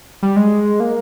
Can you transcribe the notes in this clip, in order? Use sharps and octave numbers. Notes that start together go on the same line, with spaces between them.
G3
G#3
A#3